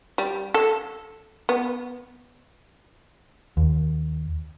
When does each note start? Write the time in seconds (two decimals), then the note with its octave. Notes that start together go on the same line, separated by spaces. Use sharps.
0.18 G3
0.54 A4
1.49 B3
3.57 D#2